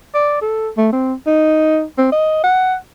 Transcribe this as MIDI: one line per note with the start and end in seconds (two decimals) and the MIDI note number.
0.14 0.41 74
0.42 0.69 69
0.77 0.90 57
0.93 1.14 60
1.27 1.83 63
1.98 2.11 60
2.12 2.39 75
2.44 2.76 78